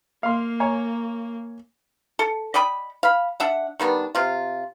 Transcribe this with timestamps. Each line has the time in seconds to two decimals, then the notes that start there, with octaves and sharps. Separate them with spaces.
0.23 A#3 F5 C6
0.60 C#5 G#5 A#5
2.19 A4
2.54 D5 D#5 G5 B5
3.03 F5 B5
3.40 D4 E5 F#5
3.80 D#3 G3 B3 D4
4.15 C3 F4